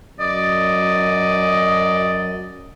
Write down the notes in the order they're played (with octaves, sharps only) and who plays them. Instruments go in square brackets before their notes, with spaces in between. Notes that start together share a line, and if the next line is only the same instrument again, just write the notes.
[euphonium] F#2 [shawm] D5 [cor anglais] D#5